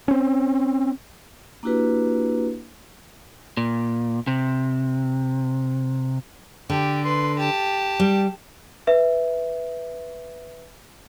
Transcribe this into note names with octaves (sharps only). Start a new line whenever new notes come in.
C4 C#4
A#3 D4 E4 F#4 G4 B4
A#2
C3
D3 G4
B4 C6
G4 A5
G3
B4 E5